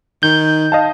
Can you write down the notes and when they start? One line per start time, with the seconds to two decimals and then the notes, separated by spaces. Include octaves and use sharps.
0.23 D#3 G6
0.72 D#5 F5 A5